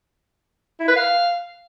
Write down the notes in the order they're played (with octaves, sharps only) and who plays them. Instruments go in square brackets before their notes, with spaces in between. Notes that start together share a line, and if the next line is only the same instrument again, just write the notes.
[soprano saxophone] E4
B4
F5